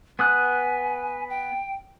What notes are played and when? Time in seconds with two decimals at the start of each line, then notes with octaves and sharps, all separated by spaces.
0.19 B3 G#5 D#6 F#6
1.30 G5